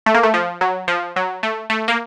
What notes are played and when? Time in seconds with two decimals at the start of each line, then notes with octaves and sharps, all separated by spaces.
0.06 A3
0.14 A#3
0.23 A3
0.34 F3
0.61 F#3
0.88 F3
1.16 F#3
1.43 A3
1.70 A3
1.88 A#3